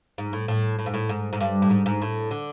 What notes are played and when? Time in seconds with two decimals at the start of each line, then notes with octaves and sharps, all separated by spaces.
0.18 G#2
0.33 A2
0.48 A2
0.79 A2
0.86 G#2
0.94 A2
1.09 G#2
1.33 G#2
1.40 G2
1.62 A2
1.70 G#2
1.86 G#2
2.02 A2
2.31 D3